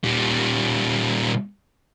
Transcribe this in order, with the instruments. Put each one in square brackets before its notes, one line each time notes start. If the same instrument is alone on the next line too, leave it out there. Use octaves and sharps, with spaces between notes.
[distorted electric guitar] A#2 G3